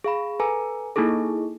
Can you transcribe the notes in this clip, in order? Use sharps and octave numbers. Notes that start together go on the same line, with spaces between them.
G#4 F5 B5
A4 B4 G#5 A#5
A#3 D#4 E4 G#4 A4